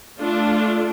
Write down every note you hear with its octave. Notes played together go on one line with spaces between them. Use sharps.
A3 D4 F4